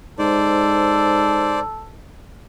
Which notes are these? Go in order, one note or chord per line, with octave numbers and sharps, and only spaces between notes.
G#2 A4 C5 D5